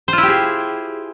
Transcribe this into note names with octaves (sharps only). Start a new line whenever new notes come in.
E4 F4 G4 G#4 C5